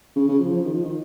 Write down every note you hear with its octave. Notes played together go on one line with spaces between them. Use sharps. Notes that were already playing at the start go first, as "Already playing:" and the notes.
C#3
C#3
F3
F3
D#3
F3
D#3